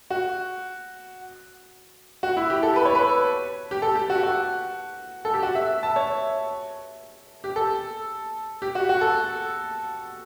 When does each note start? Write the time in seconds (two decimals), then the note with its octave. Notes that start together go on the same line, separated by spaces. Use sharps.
0.10 F#4
2.23 F#4
2.37 E4
2.50 G4
2.63 A4
2.76 B4
2.85 C#5
2.95 B4
3.71 G4
3.82 A4
3.95 G4
4.10 F#4
4.23 F#4
5.25 A4
5.34 G4
5.43 F#4
5.55 E5
5.83 A5
5.96 C#5
7.44 G4
7.56 A4
8.62 G4
8.75 F#4
8.89 F#4
9.01 A4